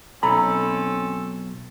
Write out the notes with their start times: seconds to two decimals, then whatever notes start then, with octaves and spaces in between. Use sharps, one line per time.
0.23 B1 C4 C#4 A4 A#5 B5